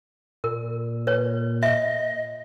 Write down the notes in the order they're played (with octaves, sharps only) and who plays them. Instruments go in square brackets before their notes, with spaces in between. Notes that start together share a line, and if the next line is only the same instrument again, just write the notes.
[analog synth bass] A#2 [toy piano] A#4
[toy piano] B4 C#5
[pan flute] D#5 [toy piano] E5